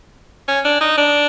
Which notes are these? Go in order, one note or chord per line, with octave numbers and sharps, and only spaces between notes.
C#4
D4
D#4
D4